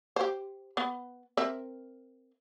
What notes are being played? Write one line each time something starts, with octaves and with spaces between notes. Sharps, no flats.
G4 C5
B3
C4 A#4 E5